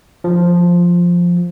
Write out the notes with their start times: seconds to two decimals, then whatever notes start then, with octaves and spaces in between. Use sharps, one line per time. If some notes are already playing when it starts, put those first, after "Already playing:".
0.24 F3